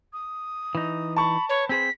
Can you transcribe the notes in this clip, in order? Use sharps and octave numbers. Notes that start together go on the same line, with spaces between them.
D#6
E3 D#4
A5 B5 C#6
B4 C#5
C4 G#4 C5 B6